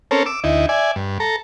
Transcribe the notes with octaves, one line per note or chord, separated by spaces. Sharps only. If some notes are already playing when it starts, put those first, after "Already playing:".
C4 C#4 A4 A#4
D6 E6
D2 D#4 E4
D5 E5 G#5
G2
A4 A#5